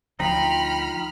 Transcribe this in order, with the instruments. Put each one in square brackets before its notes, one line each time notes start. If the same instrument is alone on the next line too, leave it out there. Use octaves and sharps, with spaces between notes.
[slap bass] D2 F3 [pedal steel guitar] D#4 F4 [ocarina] G5 [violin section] B5 F6